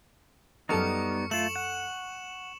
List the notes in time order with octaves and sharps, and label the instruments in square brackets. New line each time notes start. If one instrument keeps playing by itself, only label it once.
[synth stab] F#2 A4 F6 [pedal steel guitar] G3 B3 D#4 [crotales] C#6 C#7
[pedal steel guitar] A3 F4 [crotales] E7 F#7
[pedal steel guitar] F#5